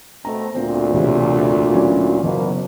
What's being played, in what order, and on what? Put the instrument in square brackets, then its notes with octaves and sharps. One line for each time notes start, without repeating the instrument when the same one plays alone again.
[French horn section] B2 A3 C4 [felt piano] A#5
[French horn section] D2 A#2 [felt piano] C4
[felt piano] E1 C3
F#3 C#4 E4
[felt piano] F#1 [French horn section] B2 A#3